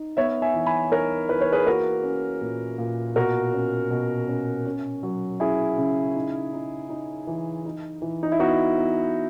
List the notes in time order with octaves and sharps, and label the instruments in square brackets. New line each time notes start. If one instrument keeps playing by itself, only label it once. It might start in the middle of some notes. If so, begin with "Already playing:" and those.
Already playing: [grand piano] D#4
B3 C#5 E5
E5 G#5
E3
G#5 B5
D#4 A#4 C#5
E3 B4
C#5
G#4 B4
A#3 F#4 A#4
C#4
A#2
A#2
B2 F#4 A#4
C#4
B2
C#4
C#4
F#3
C#4 E4 G#4
C#3
D#4
D#4
D#4
E3
D#4
E3
D#4
E4
B3 D#4 F#4
B3